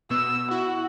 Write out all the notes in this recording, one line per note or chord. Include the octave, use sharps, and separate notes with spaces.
B2 B3 E6
E4 F#4